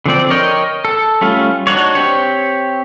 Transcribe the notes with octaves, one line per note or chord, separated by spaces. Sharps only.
D3 F3 C4 D5
A#4 C#5 D#5 G5
A4
G3 A3 C#4 F4
D4 D#4 F#4 C#5
C4 G4 C#5